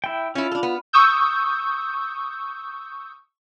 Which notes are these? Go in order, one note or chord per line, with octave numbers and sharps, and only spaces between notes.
E4 G5
C#4 E4 F4
D4 A4
B3
C#6 D#6 E6 G6